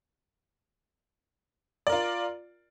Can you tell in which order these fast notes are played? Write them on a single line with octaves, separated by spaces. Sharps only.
D5 A#4 F4